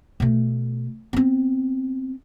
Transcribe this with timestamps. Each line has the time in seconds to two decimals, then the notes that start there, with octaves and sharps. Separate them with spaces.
0.20 B2 A3
1.13 B3 C4